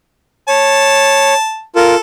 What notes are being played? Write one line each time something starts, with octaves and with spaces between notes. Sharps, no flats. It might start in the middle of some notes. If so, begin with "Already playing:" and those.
C#5 A5
F4 A4 A#4